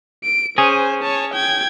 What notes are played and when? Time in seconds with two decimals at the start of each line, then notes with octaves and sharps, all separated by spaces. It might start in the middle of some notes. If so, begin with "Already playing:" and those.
0.24 D7
0.58 C#4 G#4 C5
1.02 C#5 A5
1.34 G5 G#6